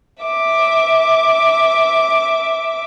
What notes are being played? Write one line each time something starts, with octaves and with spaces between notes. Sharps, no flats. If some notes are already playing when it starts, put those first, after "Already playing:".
E5 D6